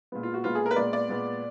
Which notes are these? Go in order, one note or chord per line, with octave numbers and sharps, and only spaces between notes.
A#2 G#3 B3
F4
F#4
A#2 G#3 B3 F4
G#4
A#4
B4
A#2 G#3 B3 D5
D5
A#2 G#3 B3